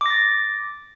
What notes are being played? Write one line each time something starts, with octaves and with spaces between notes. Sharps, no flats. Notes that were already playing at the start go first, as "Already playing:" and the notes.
D6 A6 A#6